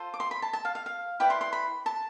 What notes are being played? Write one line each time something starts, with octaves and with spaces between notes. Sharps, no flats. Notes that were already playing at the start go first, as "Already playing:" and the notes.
Already playing: F4 A4 C5
D6
C6
B5
A5
A5
F5
F5
F5
E4 B4 D5 G5
C6
C6
B5
A5